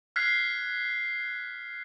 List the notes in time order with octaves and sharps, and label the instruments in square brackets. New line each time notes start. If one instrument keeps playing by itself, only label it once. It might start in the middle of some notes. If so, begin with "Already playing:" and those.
[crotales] F6 F#6 G#6 B6 C7